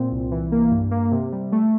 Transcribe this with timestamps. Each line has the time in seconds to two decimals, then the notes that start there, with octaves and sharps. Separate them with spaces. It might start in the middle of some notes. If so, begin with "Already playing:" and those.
Already playing: A#2 C4
0.12 C2
0.31 E3
0.52 A#3
0.71 G2
0.91 A#3
1.11 C3
1.32 G3
1.52 A3